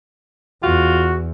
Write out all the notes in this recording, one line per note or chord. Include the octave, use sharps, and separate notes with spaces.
E2 F4 F#4